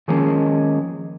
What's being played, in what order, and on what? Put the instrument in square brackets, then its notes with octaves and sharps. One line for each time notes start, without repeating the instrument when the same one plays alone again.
[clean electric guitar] D#3 F3 G#3 A#3 C#4